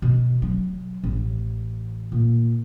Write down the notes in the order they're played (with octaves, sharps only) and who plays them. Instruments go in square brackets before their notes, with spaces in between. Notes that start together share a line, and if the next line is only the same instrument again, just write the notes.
[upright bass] B2
F#3
A1
A#2